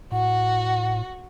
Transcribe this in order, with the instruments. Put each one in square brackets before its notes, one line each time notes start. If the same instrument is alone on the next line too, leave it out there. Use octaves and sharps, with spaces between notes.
[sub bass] A2 [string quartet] F#4 [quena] F#5